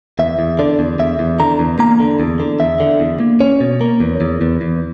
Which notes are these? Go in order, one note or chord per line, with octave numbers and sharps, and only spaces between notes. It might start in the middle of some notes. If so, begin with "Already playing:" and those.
E2 E5
E2
D3 D5
E2
E2 E5
E2
D3 A#5
E2
A#3 A#5
D3
E2
D3
E2 E5
D3
E2
A#3
C#4 C#5
B2
A#3
E2
E2
E2
E2